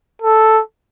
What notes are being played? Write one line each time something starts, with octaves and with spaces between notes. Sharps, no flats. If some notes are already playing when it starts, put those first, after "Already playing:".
A4